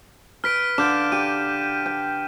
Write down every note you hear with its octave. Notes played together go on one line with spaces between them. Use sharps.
B4 F6 B6 D7
D3 F5 D6 G6 E7
G4 D#7
G5